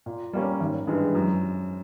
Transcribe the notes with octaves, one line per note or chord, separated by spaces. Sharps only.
A#2
G3 A#3 C#4
G#1
G2 E3 G#3
F#2